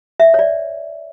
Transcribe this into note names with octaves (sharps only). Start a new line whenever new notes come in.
E5
C#5
D5